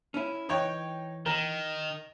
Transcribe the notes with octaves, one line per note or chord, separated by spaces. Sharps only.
C#4 E4
E3 D#4 C#5 G5
D#3 A#4